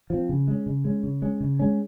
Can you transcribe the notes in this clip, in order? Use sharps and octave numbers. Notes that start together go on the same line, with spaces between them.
F3 C4
C#3
G#3 C#4
C#3
G#3 C#4
C#3
G#3 C#4
C#3
G#3 C#4